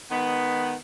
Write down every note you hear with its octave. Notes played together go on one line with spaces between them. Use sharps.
D#3 G#3 B3